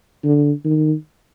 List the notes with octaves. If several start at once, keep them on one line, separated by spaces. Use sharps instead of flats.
D3
D#3